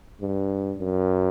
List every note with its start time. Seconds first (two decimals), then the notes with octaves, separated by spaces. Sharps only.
0.21 G2
0.78 F#2